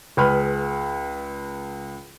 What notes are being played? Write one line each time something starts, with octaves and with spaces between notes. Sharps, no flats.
C#2 G#4 B4 B5 F6